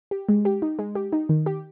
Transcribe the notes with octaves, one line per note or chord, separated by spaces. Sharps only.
G4
G#3
G4
D#4
G#3
G4
D#4
D#3
G4